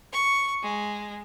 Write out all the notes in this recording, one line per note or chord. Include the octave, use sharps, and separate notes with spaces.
C#6
G#3